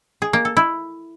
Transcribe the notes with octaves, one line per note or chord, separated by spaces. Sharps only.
G#4
A#3
A4
E4